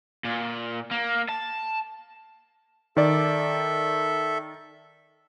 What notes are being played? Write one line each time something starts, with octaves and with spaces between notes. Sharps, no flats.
A#2
A#3
A5
D#3 A4 D5 E5